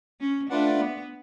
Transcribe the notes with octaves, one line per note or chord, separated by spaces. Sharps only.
C#4
A3 D4 F4 B4 D5 F#5
B3